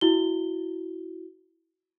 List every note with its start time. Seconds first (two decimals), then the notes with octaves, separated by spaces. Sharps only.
0.01 E4 F#4 G7